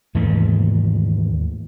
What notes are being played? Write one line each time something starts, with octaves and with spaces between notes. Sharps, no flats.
D#2 G#2 E3 A3